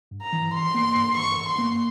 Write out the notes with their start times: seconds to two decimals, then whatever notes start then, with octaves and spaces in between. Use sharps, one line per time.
0.11 G2
0.22 A#5
0.33 E3
0.53 G2 C6
0.74 A#3
0.96 G2
1.17 E3 C#6
1.38 G2
1.48 C6
1.59 A#3